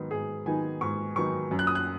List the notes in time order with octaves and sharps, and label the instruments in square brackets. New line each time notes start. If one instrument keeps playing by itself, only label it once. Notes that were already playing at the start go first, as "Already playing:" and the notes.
Already playing: [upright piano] G#2 D#3 F#3 B3 D#4
G#2 G#4
D#3 F#3 B3 D#4 G#5
G#2 C#6
D#3 F#3 B3 D#4 C#6
F#2
F#6
D#6
F#6